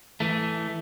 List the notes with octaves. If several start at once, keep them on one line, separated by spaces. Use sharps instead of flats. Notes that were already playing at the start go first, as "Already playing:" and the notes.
E3 A3